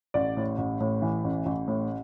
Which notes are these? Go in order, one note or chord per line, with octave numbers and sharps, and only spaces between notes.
A1 D5
A2
A1
A2
E3
A1
A1
A2